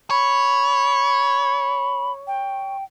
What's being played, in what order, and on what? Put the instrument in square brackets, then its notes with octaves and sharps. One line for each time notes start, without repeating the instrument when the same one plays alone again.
[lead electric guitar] C#5 [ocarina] B5
[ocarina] G5